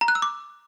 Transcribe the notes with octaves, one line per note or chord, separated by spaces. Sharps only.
A#5
F#6
E6
D6